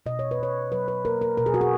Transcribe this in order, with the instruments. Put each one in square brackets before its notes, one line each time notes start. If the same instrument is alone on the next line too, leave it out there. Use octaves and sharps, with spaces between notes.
[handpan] B2 D#5
C#5
B4
B2 C#5
F#3 B4
B4
A#3 A#4
A#4
B2 A#4
G#4
F#4
G#4